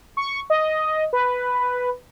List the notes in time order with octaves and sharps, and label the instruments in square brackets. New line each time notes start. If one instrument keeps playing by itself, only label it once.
[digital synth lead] C#6
D#5
B4